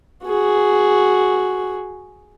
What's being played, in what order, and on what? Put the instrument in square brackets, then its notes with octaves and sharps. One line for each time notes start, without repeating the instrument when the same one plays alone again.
[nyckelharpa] F#4 G#4